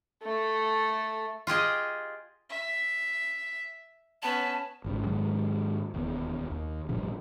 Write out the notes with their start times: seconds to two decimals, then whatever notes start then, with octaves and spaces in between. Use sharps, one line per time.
0.23 A3 A4
1.47 F4 G4 G#4 D#5
2.49 E5
4.23 B3 C#4 A5
4.84 G#1 G#2 C#3
5.07 G#2 D#3 F#3 G#3
5.94 E1 D#2 B3
6.51 D#2
6.89 A1 G2 B2 F3